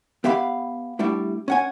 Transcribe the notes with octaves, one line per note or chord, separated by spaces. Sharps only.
B3 G4 E5 F5 B5
G3 A3 D4 E4
C#4 F#5 G#5